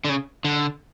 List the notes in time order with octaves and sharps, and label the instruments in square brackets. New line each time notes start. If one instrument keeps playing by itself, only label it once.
[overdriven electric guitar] D3
C#3
D3